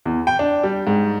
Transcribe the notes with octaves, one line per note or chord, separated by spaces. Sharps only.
E2
G5
D4
G3
G#2